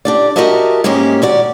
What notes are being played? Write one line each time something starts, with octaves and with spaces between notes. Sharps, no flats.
D4 G4 D5
F#4 G4 A#4 D#5 E5 A5
G#2 G#3 A#3 C#4 G4
D#2 F#4 D5